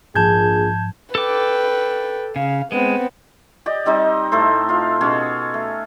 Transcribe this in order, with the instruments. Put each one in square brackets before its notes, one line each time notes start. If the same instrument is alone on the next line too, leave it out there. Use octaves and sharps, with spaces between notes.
[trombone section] A#1 G#4 [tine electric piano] G#2 F3 [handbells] A5 G6 G#6
[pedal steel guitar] A4 D6 [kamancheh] B4 G5
[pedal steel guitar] C#3 [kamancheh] F5
[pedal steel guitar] G#3 [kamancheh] B3 C4
[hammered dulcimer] G4 D5 D#5
G3 C4 D#4 D#5
A2 A3 A4 C5
F4 F5
B2 C#4 G#4 A4
A3